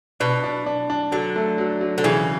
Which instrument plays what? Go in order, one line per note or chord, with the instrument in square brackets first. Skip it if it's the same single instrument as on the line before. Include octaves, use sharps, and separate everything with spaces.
[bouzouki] B2 [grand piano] D4
[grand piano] D4
D4
D4
[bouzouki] D3 [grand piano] F#3
[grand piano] A3
F#3
F#3
[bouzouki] D3
[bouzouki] C#3 [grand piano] E3